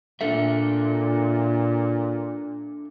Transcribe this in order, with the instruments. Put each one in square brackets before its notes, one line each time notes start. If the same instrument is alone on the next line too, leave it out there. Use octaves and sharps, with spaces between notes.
[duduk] A#2 [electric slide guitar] D4 A4 E5